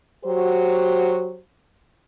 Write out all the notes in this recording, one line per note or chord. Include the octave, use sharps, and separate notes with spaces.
F#3 F#4 G4 C5